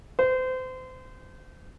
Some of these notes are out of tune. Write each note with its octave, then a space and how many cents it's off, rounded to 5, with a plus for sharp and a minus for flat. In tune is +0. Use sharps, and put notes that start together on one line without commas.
C5 -30